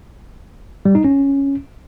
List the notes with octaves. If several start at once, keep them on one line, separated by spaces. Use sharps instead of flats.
G3
D#4
C#4